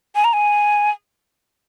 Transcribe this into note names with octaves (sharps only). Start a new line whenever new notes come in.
G#5
A#5
G#5